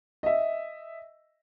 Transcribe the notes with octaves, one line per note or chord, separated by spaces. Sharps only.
D#5 E5